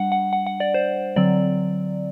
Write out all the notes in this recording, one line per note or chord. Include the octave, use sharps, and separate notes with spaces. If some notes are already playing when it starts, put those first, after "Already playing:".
Already playing: G3 D4 F#5
F#5
F#5
F#5
D5
C5
D3 F#3 C4 D5